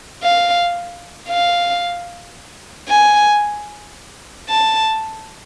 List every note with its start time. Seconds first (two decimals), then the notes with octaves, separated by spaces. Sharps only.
0.23 F5
1.28 F5
2.89 G#5
4.49 A5